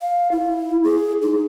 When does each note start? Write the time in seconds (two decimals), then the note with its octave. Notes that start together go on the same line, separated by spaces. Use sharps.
0.02 F5
0.32 E4
0.84 G#4
1.22 D#4